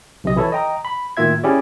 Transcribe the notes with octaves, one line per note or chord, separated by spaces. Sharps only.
B1 C3 D#5
E3 E4 A4 C#5
D#5 G5 A#5
B5
A2 D#3 A#3 F4 E5 G#6
C#4 E4 G4 G#4 D5